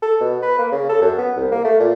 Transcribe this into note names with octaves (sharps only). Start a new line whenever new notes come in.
A4
B2
B4
A#3
C#3
A4
F#2
B3
C2
A#3
A3
A#2